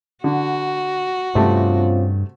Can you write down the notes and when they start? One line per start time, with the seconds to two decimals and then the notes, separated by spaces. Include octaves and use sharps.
0.24 D3 F#4
1.35 G2 C3 A3 C4 C#4 F4